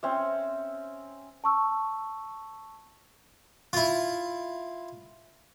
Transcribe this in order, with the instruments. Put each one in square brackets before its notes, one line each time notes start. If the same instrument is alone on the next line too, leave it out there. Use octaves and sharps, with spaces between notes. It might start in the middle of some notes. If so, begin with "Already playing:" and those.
[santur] C4 C#4 E5
[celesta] A5 C#6 E6
[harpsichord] E4 F4